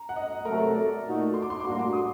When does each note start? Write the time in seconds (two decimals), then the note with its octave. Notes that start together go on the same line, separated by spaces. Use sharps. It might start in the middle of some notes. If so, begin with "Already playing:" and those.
Already playing: A#5
0.09 F#5
0.16 D#5
0.45 C3 F#3 A3 A#4
0.60 A4
0.75 D5
1.04 A#2 A3 D#4 F#4
1.34 C6
1.42 D6
1.50 C6
1.60 D6
1.64 A2 G3 A#3 D4 F#4 C6
1.79 D6
1.93 D#6